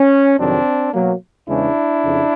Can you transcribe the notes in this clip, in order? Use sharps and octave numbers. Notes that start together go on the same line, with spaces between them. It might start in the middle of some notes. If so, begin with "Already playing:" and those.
Already playing: C#4
F2 C3 D#3 F#3 C4 D4
B2 F#3 A#3
E2 C#3 E3 G#3 D4 E4
F2 C#3